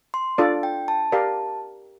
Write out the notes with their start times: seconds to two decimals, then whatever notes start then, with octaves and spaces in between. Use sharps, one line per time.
0.14 C6
0.38 D4 F4 A4 D5
0.63 G5
0.88 A5
1.12 G4 A#4 D5 F5